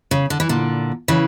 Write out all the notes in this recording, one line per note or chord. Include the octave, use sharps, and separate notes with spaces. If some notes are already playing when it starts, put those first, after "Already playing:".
C#3
D3
E3
A#2 D3
C#3 E3